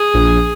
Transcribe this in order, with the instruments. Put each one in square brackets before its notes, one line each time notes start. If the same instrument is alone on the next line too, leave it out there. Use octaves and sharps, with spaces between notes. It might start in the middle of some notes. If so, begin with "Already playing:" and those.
Already playing: [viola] G#4
[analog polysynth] A#1